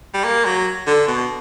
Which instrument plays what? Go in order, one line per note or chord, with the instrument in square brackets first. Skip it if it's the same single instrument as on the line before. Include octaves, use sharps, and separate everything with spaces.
[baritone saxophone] G3
A#3
F#3
D3
B2